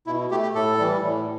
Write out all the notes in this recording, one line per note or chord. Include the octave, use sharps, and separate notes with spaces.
B2 E4
A3 G4
G4
A2 A4
E3 G3
A2